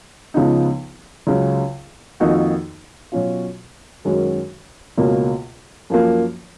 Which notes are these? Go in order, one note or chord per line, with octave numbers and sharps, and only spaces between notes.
C#2 C#3 F3 B3 D#4
C#2 C#3 F#3
F2 D#3 A#3 D#4 F#4
B2 F#3 C#4 F4
F#2 D#3 G#3 C#4 F#4
C#2 B2 A#3 C#4
F#2 F3 A#3